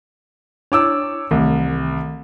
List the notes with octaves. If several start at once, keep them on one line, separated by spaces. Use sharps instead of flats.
D4 E4 C#5 D6 E6
C2 D#3 E3 A3